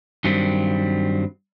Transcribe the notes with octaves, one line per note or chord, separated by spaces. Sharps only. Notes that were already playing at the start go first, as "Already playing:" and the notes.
G2 D#3 F#3 G3 C4